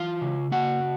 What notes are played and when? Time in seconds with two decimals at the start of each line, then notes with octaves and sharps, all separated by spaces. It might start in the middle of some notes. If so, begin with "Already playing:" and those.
Already playing: E3 F4 F5
0.21 C#3
0.52 A#3 F#4 F#5